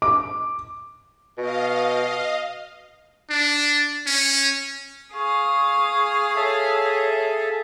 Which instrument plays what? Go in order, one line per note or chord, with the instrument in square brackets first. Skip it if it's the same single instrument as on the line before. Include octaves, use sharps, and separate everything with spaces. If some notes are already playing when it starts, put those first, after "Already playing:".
[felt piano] D6
[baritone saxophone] B2 [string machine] D#5 F5
[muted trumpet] D4
C#4
[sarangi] G#4 [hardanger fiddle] F5 D#6 [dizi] C#6
[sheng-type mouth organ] A4 E5 [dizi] C#5